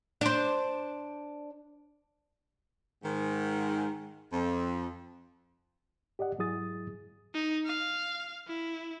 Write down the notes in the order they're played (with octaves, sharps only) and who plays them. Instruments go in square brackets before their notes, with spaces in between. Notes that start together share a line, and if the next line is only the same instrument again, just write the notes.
[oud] D4 C5
[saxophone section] G#2 D#3
F2
[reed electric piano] G4 D5 D#5 F#5
G#2 F#3 E4 G#4 D#6 A6
[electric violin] D#4
F5
E4